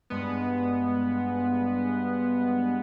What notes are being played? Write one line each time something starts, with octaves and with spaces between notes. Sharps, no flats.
G2 G#3 B3